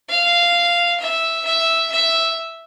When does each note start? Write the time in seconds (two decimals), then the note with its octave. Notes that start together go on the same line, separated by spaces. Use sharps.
0.09 F5
1.00 E5
1.46 E5
1.92 E5